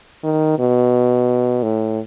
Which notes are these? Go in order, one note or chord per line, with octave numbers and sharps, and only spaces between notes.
D#3
B2
A2